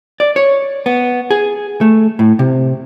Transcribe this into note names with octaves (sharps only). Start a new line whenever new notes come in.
D5
C#5
B3
G#4
A3
A2
C3